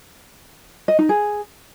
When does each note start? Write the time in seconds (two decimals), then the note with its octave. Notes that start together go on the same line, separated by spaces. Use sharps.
0.88 D#5
0.99 D#4
1.09 G#4